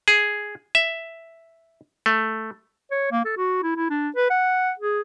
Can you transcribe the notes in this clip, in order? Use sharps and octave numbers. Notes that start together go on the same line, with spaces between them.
G#4
E5
A3
C#5
A#3
A4
F#4
E4
E4
D4
B4
F#5
G#4